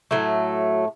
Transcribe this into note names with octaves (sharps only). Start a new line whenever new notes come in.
A2 F#3 A3